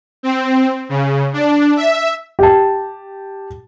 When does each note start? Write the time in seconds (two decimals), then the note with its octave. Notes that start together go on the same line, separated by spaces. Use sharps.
0.23 C4
0.89 C#3
1.33 D4
1.77 E5
2.39 G4 A5